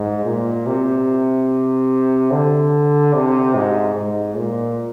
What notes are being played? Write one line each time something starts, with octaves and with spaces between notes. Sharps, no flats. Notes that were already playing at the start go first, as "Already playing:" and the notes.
Already playing: G#2
A#2
C3
D3
C3
G#2
G#2
A#2